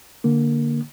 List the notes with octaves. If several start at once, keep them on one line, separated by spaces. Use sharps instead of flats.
D3 A#3